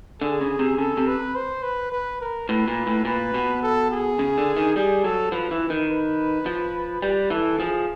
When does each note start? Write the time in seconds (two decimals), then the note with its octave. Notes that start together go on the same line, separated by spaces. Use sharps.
0.21 D3 G#4
0.41 C#3
0.59 C3
0.78 C#3 A4
0.97 C3
1.07 B4
1.35 C5
1.63 B4
1.92 B4
2.21 A#4
2.49 A2 B4
2.68 A#2
2.87 A2
3.05 A#2 B4
3.34 B2
3.62 A4
3.91 G#4
4.19 C#3
4.38 D3
4.57 D#3
4.75 G3 G#4
5.03 F#3 A4
5.32 F3 B4
5.51 E3
5.70 D#3
5.89 B4
6.46 F3
7.02 G3 B4
7.30 E3 A4
7.60 F3 G#4